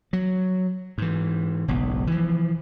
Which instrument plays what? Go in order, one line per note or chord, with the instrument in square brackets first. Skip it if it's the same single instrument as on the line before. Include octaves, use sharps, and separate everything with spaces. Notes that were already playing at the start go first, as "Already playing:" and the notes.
[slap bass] F#3
G#2 E3
F#1 B1 G#2
E3 F3